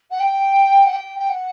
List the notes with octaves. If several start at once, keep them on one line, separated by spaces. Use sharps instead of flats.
F#5
G5
F#5
G5
G5
F#5